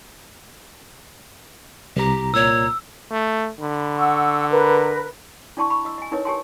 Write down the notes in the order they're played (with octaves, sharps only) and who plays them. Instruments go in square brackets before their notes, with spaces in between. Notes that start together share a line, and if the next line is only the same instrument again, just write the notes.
[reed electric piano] C2 A#5 [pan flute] G4
[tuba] A#2 [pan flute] C#5 [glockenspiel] E6
[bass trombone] A3
[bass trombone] D3 [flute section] B5
[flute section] F#5 C#6 E6
A#4 B4
[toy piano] D4 E4 D5 A5 C6 C#6
B5 C#6
D#5 E6
D#5 G#5
D#4 E4 A#4 B4 C#5 D#5
G4 A#4 C#5 G#5 A5 C6